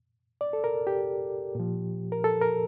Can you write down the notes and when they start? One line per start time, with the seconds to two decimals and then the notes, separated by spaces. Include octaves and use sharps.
0.41 D5
0.53 A4
0.64 A#4
0.87 G4
1.55 A#2 F3
2.12 A#4
2.24 A4
2.41 A#4